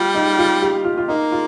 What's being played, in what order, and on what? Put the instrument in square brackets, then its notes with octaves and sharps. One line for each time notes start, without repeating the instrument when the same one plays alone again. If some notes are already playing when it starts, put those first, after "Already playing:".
Already playing: [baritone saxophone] G3 [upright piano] F4
[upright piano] D#4
F4
G4
F4
F4
[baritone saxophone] A#3 [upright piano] D#4
[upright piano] F4